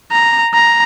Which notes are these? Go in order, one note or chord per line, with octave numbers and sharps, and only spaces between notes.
A#5
A#5